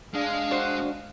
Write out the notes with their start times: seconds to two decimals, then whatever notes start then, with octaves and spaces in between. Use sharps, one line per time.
0.14 G#3 D4 F5
0.51 F#4 C5